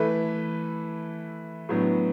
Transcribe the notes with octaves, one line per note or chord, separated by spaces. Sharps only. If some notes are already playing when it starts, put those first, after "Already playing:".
Already playing: E3 A3 E4 B4
A2 F#3 B3 D4